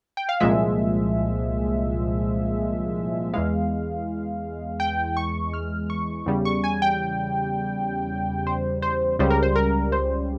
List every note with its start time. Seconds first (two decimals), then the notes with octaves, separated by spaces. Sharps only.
0.17 G5
0.29 F5
0.40 C2 A#2 F3 G#3 E5
3.34 E2 E3 G#3 F5
4.80 G5
5.17 C#6
5.53 F6
5.90 C#6
6.26 E2 C#3 G3
6.45 C#6
6.64 G#5
6.82 G5
8.47 C5
8.82 C5
9.19 C#2 C#3 G3 C5
9.30 A#4
9.43 C5
9.55 A#4
9.92 C5